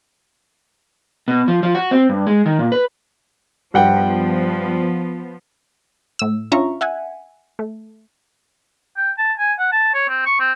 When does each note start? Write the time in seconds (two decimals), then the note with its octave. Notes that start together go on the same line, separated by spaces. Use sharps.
1.28 B2
1.48 F3
1.63 F3
1.75 F#4
1.91 C4
2.09 G2
2.27 G#3
2.46 D#3
2.59 A#2
2.72 B4
3.74 G2 F3 B3 F#5 G5
6.19 A2 E6
6.52 C#4 D4 F4 E5 A#5 C#6
6.81 E5 F#5 G#5
7.59 A3
8.97 G5
9.18 A5
9.39 G#5
9.59 F#5
9.72 A5
9.94 C#5
10.10 C4
10.26 C#6
10.40 C4